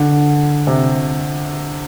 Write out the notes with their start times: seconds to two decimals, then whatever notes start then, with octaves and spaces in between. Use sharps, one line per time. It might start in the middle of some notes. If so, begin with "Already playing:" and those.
Already playing: D3
0.67 C3